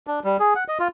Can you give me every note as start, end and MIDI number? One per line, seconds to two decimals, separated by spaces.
0.07 0.20 62
0.24 0.37 55
0.40 0.54 68
0.56 0.64 78
0.68 0.78 75
0.80 0.88 65